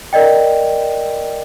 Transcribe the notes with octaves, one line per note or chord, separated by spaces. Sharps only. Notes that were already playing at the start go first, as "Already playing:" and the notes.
A#4 D5 D#5 G5